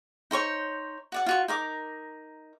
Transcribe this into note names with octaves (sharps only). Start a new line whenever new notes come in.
D#4 C5 C#5 C#6
F#4 D5 F#5
F4 F#4 C#6
D#4 A#4 D6